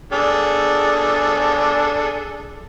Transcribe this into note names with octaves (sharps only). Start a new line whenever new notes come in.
D4 G#4 A4